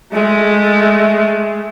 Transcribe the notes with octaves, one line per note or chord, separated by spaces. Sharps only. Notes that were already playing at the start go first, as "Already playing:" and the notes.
G#3 A3